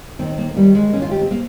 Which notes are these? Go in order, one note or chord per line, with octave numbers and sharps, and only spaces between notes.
D#2 D#3 C4
A#3
D#2 D#3 G3
G#3
D#2 D#3 C#4
F4
G4
C4
A#3